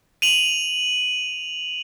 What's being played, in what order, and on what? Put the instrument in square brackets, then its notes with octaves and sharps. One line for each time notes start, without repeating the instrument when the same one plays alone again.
[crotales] D#7 F7 F#7